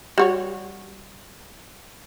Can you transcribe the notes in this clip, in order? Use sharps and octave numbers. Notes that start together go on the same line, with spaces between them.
G3 F#4 C#5